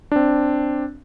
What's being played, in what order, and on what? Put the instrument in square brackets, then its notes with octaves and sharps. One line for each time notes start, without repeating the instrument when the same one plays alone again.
[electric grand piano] C4 D4